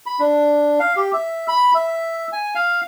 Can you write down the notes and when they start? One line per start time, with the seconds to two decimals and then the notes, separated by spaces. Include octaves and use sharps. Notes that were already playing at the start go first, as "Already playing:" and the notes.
0.06 B5
0.19 D4
0.80 F5
0.97 G4
1.13 E5
1.48 B5
1.74 E5
2.32 G#5
2.55 F5